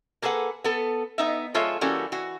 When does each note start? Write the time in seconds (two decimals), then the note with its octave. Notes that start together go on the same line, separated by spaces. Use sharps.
0.22 A#3 G#4 A4 B4 F#5
0.64 B3 A4
1.18 B3 D#4 E5
1.54 F3 G#3 F4 A4 C#5 E5
1.81 E3 G3 A#3 C#4 F#4 A4
2.12 E3 F#4